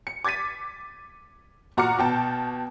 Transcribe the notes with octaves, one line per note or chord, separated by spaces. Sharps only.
C#7
D6 G#6 A6 B6 D#7
A#2 F#4 A#5 D6 F6 C#7
B2 G5 A5